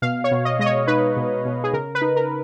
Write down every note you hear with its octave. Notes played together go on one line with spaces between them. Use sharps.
B2 F5
C#5
B2
D#5
G#3 D#5
C#5
D#4 B4
B2
B2
G#4
C#3 A#4
B4
D#4
A#4